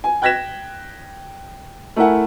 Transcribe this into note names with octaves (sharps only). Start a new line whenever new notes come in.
G#5
G5 F#6 G#6 A#6 B6 E7
A3 E4 A#4 E5 F#5 G#5